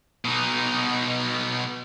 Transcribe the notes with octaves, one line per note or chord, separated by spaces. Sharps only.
B2 D#4